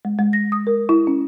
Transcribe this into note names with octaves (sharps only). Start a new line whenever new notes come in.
G#3
G#3
A#6
D#6
A#4
E4
C#4